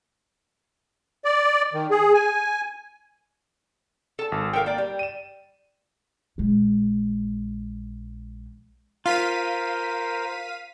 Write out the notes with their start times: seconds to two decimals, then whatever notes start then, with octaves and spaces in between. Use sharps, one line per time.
1.25 D5
1.74 D#3
1.91 G#4
2.14 G#5
4.19 A4 A5
4.32 G#1
4.53 A4 A#4 F5 G5
4.66 A#3 D5
4.78 G3
4.99 D#7 E7
6.38 A#1 G#3
9.06 F4 A#4 C5 F5 B6 D#7